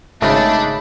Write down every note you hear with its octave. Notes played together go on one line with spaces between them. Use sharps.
G#1 C#3 A3 D4 D#4 B5